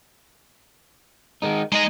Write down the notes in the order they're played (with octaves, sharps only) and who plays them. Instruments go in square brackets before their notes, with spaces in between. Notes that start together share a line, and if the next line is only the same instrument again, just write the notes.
[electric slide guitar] D#3 G#3 D#4
[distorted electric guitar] G#3 D#5 [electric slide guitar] D#4